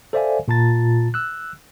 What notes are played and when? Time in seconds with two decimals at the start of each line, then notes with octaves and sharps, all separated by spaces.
0.13 A4 C5 D5 E5 F5 G#5
0.48 A#2 F4 A5 A#5 A6
1.14 E6 F#6